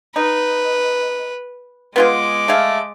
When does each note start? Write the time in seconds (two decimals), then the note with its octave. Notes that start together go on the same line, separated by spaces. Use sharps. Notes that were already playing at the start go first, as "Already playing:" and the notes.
0.16 D#4 B4
1.96 G#3 B3 F4 G#4 D6
2.48 A3 G#4 F5